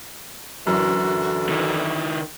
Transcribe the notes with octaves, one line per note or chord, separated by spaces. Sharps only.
F#2 D3 E3 F#4
D#3 E4